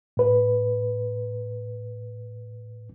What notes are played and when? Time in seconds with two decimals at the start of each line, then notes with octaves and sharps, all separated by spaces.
0.17 A2 B4